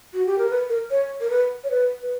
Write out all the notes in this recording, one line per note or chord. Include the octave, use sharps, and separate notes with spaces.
F#4
G4
A#4
B4
A#4
C#5
A#4
B4
C#5
B4
B4